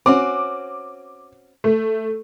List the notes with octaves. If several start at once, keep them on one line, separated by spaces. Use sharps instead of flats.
C4 C#4 F#4 D6
A3